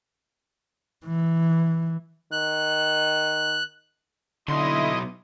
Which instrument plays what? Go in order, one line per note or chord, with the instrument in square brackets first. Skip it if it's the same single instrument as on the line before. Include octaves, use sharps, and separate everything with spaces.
[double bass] E3
[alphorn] D#3 [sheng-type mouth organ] F#6
[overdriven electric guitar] B1 C6 [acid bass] D3 [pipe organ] E4 D#5